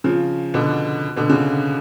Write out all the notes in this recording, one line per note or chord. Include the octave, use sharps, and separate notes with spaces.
C#3 F3
B2 D3
B2 D3
C#3